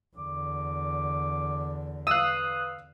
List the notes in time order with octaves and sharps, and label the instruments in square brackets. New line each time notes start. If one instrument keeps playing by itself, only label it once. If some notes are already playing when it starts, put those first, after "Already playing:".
[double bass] E2 D3 [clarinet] D6
[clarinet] B4 [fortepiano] F5 E6 [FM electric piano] D#6 F#6